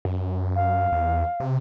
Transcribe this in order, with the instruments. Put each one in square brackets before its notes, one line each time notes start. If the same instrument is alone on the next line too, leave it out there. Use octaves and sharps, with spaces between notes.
[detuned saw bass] F#2
[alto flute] F5
[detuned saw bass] E2
C3